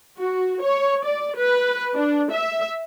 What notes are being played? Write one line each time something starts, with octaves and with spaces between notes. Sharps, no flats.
F#4
C#5
D5
B4
D4
E5